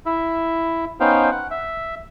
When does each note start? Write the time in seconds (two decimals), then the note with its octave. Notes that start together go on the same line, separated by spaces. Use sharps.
0.06 E4 E5
1.00 B3 C#4 D#4 C5 F5 G5
1.31 F#5
1.51 E5